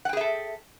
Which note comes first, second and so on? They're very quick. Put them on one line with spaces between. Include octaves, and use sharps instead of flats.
F#5 G5 G#4 E5 A4